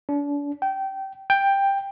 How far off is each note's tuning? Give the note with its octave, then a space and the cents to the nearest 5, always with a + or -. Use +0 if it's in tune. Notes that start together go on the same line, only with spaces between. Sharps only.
D4 -35
G5 -20
G5 +10